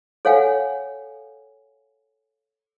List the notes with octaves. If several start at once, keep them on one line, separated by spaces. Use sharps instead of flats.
A4 C#5 F5 F#5 G#5